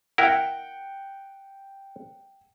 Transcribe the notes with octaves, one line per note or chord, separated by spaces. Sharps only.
E4 A#4 F#5 G5